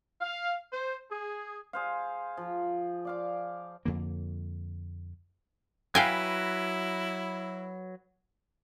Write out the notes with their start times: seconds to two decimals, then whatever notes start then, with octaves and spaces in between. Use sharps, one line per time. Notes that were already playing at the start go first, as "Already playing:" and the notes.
0.21 F5
0.73 C5
1.11 G#4
1.73 G#4 C5 F5
2.37 F3
3.05 D5 F5 D6
3.85 F2 D3 A#3
5.95 F#3 E4 B4 F5 G5 G#5